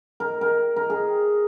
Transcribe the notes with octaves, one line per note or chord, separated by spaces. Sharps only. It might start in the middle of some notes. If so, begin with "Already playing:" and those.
A#4
A#4
A#4
G#4